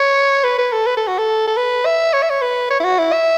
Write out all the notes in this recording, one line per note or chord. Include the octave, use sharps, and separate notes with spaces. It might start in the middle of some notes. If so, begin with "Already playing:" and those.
Already playing: C#5
B4
B4
A4
B4
A4
F#4
A4
A4
B4
E5
C#5
E5
C#5
B4
C#5
E4
F#4
E4
E5